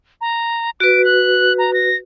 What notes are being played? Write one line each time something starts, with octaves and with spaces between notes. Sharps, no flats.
A#5
F#4 B4 D7
F#6
A#5
A#6